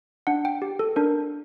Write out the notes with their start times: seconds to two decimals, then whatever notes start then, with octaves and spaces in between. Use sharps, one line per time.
0.27 D4 F#5
0.45 G5
0.62 G4
0.79 A4
0.96 D4 A#4